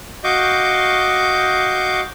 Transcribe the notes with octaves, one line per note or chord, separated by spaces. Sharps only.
F#4 D#5 F5 C#6 D6 G6